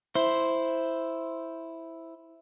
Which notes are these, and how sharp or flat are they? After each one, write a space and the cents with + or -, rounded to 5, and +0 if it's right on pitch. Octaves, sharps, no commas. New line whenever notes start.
E4 +0 C5 +0